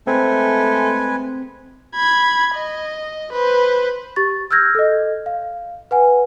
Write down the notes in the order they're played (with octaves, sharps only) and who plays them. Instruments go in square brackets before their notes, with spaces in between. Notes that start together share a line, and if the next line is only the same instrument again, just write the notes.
[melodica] G#3 B4 G#5 [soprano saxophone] A3 [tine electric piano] C4
[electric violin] B5 G#6
D#5
B4 C5
[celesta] G4 C#6 A6
E6 F6 G6 G#6 A#6
A4 D#5
F5
B4 F#5 G#5